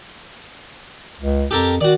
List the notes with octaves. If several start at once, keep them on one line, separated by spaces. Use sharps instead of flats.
C#2
F2 G4 A4 A#4
D#3 F#4 D5